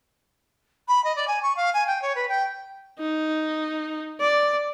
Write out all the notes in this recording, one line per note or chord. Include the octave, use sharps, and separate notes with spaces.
B5
D#5
D5
G#5
C#6
F5
G#5
G5
C#5
B4
G5
D#4
D5